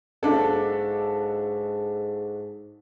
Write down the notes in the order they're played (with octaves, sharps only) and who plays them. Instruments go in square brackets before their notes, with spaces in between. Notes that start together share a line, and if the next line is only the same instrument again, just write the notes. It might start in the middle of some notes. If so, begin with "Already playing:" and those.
[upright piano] B1 D4 A4 [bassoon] G#2